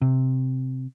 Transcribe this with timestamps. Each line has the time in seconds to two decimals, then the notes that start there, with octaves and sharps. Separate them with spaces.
0.02 C3